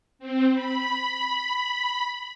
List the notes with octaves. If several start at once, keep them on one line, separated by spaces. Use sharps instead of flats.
C4
B5